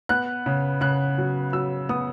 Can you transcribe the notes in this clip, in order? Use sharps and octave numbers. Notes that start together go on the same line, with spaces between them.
B3 F#6
C#3
C#3 F#6
F#3
F#3 E6
B3 D#6